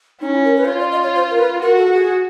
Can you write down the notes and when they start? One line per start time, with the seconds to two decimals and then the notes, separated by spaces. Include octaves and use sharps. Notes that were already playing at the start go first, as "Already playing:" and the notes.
0.21 C#4 D#4
0.33 E4
0.45 A#4
0.57 B4
0.65 C5
0.68 F4 C#5
0.80 D5
0.92 D#5
1.03 C#5
1.15 C5
1.30 A#4
1.38 B4
1.62 F#4 A#4
1.77 A4
1.93 G#4